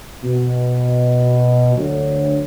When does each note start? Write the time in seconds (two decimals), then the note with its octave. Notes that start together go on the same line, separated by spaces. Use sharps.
0.24 B2
1.76 D2 F#3